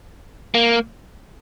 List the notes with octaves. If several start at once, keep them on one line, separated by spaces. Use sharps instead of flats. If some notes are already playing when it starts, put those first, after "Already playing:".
A#3